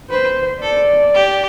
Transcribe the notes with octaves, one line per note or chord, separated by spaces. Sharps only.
B4 C5
A4 D5
G4